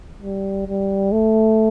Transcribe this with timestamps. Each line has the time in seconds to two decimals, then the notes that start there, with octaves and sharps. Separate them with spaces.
0.22 G3
0.67 G3
1.12 A3